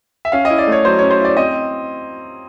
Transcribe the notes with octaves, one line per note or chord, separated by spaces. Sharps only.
E5
C#4 F5
D#5
E4
D5
A3 C#5
F#3 C5
C#4 C#5
C5
E4 D5
C4 D#5